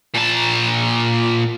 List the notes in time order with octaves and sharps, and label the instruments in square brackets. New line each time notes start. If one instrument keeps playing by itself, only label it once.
[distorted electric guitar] A#2 A5